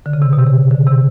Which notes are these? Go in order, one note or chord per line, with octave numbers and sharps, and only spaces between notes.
D3
C#3
C3
B2
C3
C#3
D3
C3